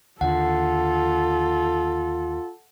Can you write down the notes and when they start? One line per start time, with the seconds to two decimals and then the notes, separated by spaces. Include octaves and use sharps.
0.21 D#2 D3 F4 A4 F#5